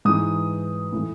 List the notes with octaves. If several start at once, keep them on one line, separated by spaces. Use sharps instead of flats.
G#2 E3 D#6
A2 E3